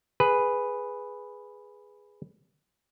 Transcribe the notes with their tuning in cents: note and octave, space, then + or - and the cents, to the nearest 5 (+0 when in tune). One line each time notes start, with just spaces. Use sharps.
G#4 +0 B4 +0